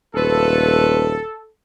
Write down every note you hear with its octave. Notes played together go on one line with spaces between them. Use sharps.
D#1 F3 A3 A4 B4